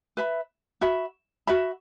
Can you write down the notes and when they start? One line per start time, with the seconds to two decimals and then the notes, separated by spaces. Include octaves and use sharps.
0.17 B4 E5 B5
0.81 F#4 E5 B5
1.47 F#4 E5 B5